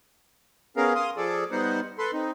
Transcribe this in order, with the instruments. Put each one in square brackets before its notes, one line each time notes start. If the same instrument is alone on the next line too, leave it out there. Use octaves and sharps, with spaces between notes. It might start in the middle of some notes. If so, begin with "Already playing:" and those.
[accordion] B3 C#4 G#4 A#4 F5
F5 C6 D#6
F3 G#4 A4 D5
G3 B3 D#4 C5 F#5
A4 B4 C6
C4 D#4